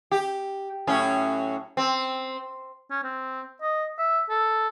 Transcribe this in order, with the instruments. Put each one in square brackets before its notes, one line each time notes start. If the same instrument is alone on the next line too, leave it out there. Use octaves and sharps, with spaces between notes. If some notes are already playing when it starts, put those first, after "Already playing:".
[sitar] G4
A2 F#3 C#4
C4
[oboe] C#4
C4
D#5
E5
A4